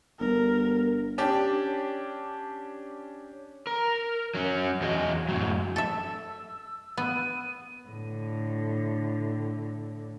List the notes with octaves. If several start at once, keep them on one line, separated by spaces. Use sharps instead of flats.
G1 A#4
C#4 D4 G4
A#4
F#3 C#4
E2 F#4 G#4 D#5
F#2 A2 F#3
A4 E5 E6
B3 D#7
A2 D3